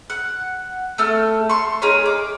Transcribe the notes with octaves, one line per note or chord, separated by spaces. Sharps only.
F#5
A3 A4 E6 F6
C6 C#6
D#4 G#4 A#4 C#5
D6